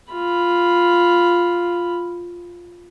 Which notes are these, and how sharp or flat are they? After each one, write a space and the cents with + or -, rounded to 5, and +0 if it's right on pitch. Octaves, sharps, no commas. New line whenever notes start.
F4 +0 B5 +0